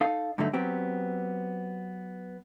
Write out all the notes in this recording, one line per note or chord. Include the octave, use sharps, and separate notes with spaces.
D#4 A4 F5
G2 D3 F#3 A3 D#4
F#3 B3 C4 G4